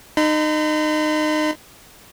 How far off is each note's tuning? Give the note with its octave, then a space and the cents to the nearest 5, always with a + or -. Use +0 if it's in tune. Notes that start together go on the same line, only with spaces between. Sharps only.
D#4 -25 B5 +45